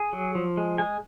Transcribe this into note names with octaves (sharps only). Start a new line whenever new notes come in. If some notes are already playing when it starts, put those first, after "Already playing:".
Already playing: G#4
F#3
F3
G#3
G#3 G#5